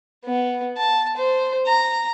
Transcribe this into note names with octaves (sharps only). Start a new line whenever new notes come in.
B3
A5
C5
A#5